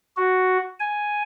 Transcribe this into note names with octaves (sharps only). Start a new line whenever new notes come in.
F#4
G#5